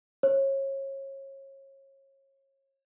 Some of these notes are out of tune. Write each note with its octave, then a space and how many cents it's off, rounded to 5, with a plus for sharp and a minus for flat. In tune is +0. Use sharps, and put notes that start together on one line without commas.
C#5 -30